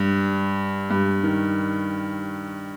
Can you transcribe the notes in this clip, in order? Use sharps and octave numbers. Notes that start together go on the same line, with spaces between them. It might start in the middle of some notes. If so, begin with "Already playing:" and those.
Already playing: G2
G2
D#3